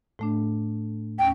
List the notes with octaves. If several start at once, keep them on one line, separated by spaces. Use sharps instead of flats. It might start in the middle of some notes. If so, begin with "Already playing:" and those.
A2 A3 D4
D#2 C#4 G5